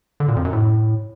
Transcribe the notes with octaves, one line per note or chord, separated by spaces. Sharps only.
D3
A#2
F2
F#2
A2